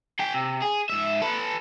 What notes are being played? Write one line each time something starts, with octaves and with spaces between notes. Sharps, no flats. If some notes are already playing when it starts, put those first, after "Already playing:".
G#4 G5
C3
G#4
G#2 E5
A4 B4